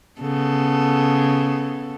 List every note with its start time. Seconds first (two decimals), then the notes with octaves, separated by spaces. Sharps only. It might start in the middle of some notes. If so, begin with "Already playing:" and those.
0.21 C#3 B3 A4